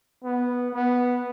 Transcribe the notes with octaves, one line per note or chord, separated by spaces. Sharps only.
B3
B3